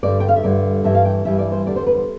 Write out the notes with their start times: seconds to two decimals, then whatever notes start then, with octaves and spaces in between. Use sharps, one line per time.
0.03 G2 D3 G3 D5
0.20 G5
0.28 F5
0.36 E5
0.43 G2 D3 G3 D5
0.84 G2 E3 G3 E5
0.95 F5
1.05 G5
1.25 G2 E3 G3 E5
1.39 D5
1.52 C5
1.66 E2 D3 G3 D5
1.76 C5
1.87 B4
1.96 C5